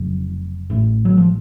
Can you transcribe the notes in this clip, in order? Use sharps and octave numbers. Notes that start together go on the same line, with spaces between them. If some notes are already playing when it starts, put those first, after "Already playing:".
Already playing: F1 F2 C#3 F#3
A1 A2
F#3
F3